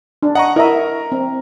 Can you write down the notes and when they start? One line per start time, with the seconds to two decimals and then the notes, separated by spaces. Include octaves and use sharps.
0.23 D4
0.35 D#5 F#5 A#5 C#6
0.56 E4 A#4 D#5 E5 A#5
1.12 C4